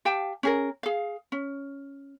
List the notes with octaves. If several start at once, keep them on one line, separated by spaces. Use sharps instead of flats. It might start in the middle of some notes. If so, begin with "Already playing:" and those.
G4 F5 G5 A5
C#4 G#4 A#4
G#4 F5
C#4